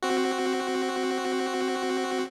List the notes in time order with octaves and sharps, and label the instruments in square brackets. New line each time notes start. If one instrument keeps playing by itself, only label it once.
[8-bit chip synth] C4 F#4